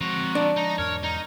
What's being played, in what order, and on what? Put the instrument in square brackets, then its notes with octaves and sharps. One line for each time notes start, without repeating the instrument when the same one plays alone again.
[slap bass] F3 G#3 [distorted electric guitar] C4 A#5 [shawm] F#4
[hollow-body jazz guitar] D4
[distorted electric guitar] D#4 [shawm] A#5
[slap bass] E2 G#2 [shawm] A#4 [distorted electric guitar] C#5
[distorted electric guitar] D#4 [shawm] A#5